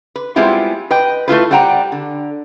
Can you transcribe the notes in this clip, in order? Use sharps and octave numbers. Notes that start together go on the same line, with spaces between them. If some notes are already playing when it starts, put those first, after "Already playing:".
B4
G3 G#3 B3 C4 E4 F4
B4 D#5 G5
A3 E4 F4 B4
G3 C5 F#5 G5 A#5
D3